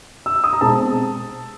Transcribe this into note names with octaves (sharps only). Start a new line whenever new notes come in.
E6
D#6
A#5
B2 G#3 C4 A5